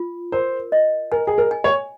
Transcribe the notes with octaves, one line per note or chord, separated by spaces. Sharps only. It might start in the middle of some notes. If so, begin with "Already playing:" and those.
Already playing: F4
A#4 C5
D#5
A#4 G#5
G#4
A#4
G#5
C#5